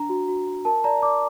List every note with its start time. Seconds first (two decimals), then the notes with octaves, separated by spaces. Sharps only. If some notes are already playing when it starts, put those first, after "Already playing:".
Already playing: D4 A#5
0.09 F#4
0.28 F#4
0.47 F#4
0.65 A#4 A5
0.84 D5 A#5
1.03 D5 D6